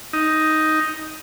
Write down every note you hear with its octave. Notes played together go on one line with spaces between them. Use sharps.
D#4